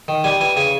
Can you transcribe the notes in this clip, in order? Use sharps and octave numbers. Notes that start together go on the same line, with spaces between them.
D#3
G3 G#5
E3 G#5
C#3 G#5